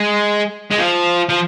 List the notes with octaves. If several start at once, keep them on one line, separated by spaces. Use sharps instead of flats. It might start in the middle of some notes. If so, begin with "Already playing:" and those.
Already playing: G#3
G#3
F3
F3